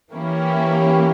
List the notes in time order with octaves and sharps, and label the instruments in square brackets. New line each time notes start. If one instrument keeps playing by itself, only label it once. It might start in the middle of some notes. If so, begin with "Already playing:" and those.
[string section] E3 A#3 C#4 E4 G4